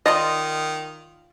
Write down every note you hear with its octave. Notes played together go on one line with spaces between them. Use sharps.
D#3 F4 D5 D#5 C6